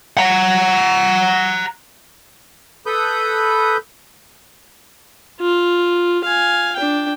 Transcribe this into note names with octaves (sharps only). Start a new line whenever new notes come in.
F#5 A#5
A4 B4 B5 D#6 G6
F4
F5 G#5
D4 G5